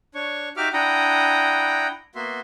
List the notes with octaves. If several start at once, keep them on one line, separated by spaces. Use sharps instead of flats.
D4 C#5 C#6
D#4 F#4 G4 E5 D6 F6
D4 E4 F#5 G5 A#5 D#6
A#3 B3 F#4 E5 C6